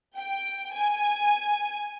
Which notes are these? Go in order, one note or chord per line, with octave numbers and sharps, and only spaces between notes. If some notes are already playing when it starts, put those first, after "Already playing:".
G5
G#5